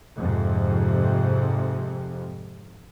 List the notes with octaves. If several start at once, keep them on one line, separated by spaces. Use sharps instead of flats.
F2 G#2 C3